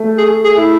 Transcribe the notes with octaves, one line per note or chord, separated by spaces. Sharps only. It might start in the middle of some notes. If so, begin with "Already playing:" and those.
Already playing: A3
G#4
G#4
E4